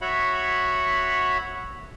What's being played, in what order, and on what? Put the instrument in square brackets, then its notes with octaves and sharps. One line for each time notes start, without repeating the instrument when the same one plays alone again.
[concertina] F#4 C#5 E5 F#5 B5